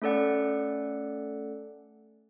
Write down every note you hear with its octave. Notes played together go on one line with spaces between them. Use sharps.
A3 C#4 A4 D5 F#5